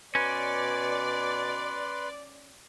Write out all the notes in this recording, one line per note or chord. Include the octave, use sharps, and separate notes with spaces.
B2 C#4 B4 D5 C6